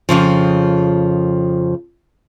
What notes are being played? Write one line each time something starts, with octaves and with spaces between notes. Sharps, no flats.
F2 G#2 C#3 F3